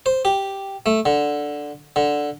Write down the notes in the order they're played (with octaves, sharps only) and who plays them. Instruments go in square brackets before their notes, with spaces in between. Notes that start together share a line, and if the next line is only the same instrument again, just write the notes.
[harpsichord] C5
G4
A3
D3
D3